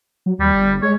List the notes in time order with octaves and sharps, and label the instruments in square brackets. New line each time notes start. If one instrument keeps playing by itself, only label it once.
[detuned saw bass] F#3
[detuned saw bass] D#2 [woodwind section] G3
[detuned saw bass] G1
[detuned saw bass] G#3 [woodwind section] C#5